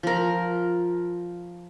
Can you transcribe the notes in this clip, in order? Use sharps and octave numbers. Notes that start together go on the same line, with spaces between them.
F3 A#4